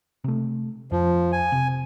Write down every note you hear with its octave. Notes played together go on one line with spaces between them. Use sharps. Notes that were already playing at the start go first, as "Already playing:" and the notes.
C3 A3
F2 F3
G#5
C3